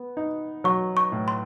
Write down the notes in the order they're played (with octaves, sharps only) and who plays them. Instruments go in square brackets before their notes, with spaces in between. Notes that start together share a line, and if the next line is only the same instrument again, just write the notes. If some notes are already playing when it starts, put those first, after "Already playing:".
Already playing: [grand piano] B3
D#4
[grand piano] F#3 [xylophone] C#6
[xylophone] C#6
[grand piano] A2
[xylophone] C6